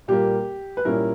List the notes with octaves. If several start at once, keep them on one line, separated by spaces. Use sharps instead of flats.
A#2 G3 A#3 G4
B4
A#2 G3 C#4 E4 A#4